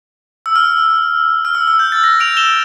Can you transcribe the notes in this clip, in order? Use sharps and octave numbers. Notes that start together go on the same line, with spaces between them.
E6
F6
F6
E6
E6
G6
A6
A#6
D7 F7
E7 G7